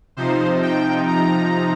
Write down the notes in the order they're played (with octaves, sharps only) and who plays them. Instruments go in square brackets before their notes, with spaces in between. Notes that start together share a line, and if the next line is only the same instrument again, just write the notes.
[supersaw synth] C3 F3 D#4 C5
G5
A#5